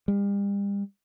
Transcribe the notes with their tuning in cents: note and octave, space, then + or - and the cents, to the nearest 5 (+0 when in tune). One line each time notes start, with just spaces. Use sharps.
G3 +40